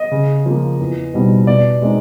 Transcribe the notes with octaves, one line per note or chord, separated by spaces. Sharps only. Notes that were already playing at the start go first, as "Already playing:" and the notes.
Already playing: D#5
C#3
F3 A#3
E2
B2 G3 C4 D#4
B2 D5
G#3 C4 D#4